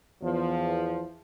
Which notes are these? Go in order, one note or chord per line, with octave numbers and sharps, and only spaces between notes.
E2 F3